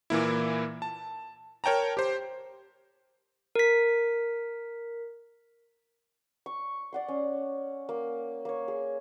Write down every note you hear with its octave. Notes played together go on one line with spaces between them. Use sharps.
A#2 E3 A#3 E4
A5
A#4 C#5 G5 A5 A#5
G4 C5
A#4 B6
C#6
D5 F#5 C6
C#4
A#3
A#3 C#5
G#4